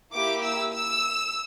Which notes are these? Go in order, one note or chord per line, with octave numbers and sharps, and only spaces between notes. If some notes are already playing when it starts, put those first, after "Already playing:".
A#3 E4 G4 D6
E6
E6